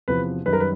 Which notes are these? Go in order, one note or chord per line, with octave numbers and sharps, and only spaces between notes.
E2 C3 F3 B4
F#2 D#3 G3 B4
A#4
B4